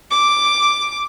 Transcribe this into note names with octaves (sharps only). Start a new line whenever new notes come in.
D6